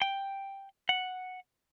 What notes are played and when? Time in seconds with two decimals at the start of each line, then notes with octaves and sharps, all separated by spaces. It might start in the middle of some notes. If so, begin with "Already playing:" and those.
0.02 G5
0.89 F#5